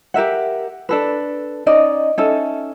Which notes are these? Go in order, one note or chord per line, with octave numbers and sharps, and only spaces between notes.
G4 A#4 E5 F#5
D4 A4 B4
C#4 D#4 D5 D#5
C#4 D#4 A4 E5